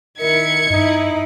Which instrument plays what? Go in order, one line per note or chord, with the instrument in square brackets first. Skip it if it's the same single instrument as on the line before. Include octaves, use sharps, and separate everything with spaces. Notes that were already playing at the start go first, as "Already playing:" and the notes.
[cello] D#3 E4 [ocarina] A#4 [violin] G#6 C#7
[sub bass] G2 [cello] D#4 E4 [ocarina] D#5